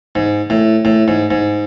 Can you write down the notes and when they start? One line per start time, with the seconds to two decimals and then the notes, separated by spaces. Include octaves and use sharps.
0.15 G#2
0.50 A2
0.85 A2
1.08 G#2
1.31 G#2